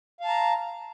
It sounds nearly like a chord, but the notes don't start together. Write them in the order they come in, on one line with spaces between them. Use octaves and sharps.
F5 A5 A#5